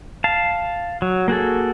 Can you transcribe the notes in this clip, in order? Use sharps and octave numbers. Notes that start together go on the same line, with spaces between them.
F5 A5
F#3
A#3 F#4 G#4 A4